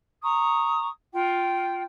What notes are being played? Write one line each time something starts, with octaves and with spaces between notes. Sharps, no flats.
A#5 C#6 D#6
F4 G5